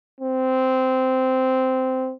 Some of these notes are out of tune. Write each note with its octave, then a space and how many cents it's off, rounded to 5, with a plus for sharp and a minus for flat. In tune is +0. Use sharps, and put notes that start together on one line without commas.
C4 -10